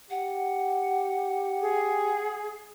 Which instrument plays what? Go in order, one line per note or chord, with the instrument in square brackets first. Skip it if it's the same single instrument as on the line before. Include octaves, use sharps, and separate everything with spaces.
[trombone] G4 [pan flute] F#5
[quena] G#4